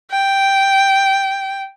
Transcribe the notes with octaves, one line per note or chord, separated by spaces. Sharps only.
G5